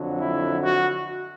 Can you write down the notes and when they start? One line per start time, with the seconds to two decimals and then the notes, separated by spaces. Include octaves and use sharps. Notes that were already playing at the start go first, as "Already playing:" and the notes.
Already playing: F2 D3 F#3
0.19 E4
0.63 F#4